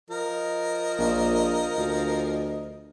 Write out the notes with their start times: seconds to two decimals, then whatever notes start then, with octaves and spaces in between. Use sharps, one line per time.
0.10 F3 A#4 D#5
0.99 A#1
1.77 D2